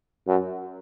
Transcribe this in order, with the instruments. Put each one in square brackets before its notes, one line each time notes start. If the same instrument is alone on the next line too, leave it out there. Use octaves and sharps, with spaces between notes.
[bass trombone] F#2